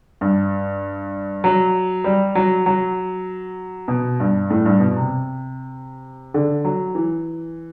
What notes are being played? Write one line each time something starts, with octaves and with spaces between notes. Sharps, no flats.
G2
F#3
G3
F#3
F#3
B2
G2
A2
G2
B2
C3
D3
F#3
E3